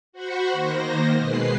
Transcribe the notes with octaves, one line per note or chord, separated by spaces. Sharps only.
F#4 C5 F#5 B5 C#6
D#3 A#3 C5 A#6
B2 G#3 B4 C7